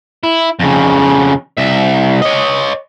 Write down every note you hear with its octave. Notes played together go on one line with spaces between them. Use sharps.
E4
F2 C#3
C2 E5
C#5 D#5